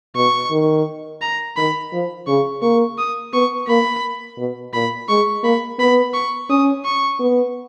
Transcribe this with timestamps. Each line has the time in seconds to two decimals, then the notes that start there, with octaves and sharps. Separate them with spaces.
0.16 B2 C#6
0.51 D#3
1.21 A#5
1.57 D#3 B5
1.93 F3
2.27 C#3 C#6
2.62 A#3 C#6
2.98 D#6
3.33 B3 C#6
3.68 A#3 B5
4.38 B2
4.73 A#2 B5
5.08 G#3 C#6
5.43 A#3 B5
5.79 B3 B5
6.14 C#6
6.50 C#4 D#6
6.85 C#6
7.20 B3